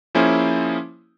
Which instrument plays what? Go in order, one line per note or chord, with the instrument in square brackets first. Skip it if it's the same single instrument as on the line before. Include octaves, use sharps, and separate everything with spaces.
[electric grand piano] F3 A#3 C#4 E4 G#4 C5